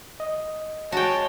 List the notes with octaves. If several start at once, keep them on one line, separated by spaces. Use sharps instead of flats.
D#5
G#3 F#4 C#5 G5 A5